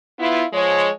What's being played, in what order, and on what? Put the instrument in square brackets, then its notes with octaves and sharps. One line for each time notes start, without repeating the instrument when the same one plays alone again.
[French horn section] B3 E4 F4
F3 G#3 C#5